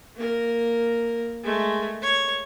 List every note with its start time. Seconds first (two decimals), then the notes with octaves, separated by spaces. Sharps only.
0.16 A#3 A#4
1.44 G#3 A3
2.02 C#5